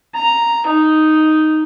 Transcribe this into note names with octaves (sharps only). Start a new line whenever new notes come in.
A#5
D#4